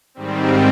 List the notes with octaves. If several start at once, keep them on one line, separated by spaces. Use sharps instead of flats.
G#2 D#3 G3 C4